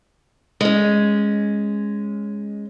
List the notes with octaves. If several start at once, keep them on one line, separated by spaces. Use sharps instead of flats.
G#3 C#4